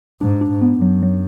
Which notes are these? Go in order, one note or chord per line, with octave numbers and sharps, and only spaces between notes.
G#2 D4
D4
G#2
B3
F#2 F#3
F#3